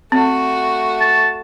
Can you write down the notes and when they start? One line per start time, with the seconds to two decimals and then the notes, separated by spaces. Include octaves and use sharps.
0.12 A3 C4 F#4
1.00 A5